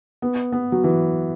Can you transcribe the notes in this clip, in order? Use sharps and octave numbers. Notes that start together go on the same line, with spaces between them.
B3
B3
F#3
E3